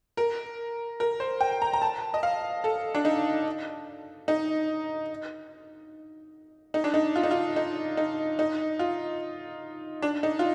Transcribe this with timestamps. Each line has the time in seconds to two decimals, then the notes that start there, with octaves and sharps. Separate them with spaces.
0.17 A#4
1.00 A#4
1.20 C5
1.41 G5
1.62 A#5
1.73 A#5
1.82 A5
2.14 D#5
2.23 F5
2.64 A4
2.95 D4
3.05 D#4
4.28 D#4
6.74 D#4
6.84 D4
6.94 D#4
7.16 F4
7.23 D#4
7.31 F4
7.56 D#4
7.97 D#4
8.39 D#4
8.79 F4
10.02 D4
10.23 D#4
10.39 F4